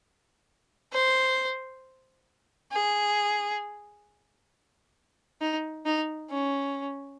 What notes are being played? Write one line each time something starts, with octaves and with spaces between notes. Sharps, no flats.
C5
G#4
D#4
D#4
C#4